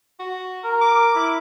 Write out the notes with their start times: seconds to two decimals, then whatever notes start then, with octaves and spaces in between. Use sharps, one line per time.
0.20 F#4
0.64 A#4
0.81 D6
1.16 E4